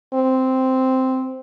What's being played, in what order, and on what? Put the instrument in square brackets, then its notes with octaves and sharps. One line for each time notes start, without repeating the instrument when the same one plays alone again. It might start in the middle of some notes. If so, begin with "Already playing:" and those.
[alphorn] C4